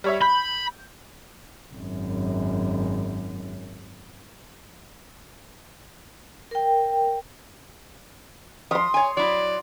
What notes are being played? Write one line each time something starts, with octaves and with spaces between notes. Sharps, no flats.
G3 C#5 E5
B5 G6
G#1 F#2
A#4 G5
F3 C6 D#6
C#5 G#5
F#3 E4 D5